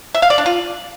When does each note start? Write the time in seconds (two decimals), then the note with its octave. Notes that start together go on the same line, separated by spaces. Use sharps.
0.14 E5
0.22 F5
0.30 D5
0.38 D4
0.46 F4